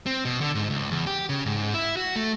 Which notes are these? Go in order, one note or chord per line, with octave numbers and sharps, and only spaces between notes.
C4
B2
D3
G#2
C#2
E2
G4
C#3
G#2
E4
F#4
A3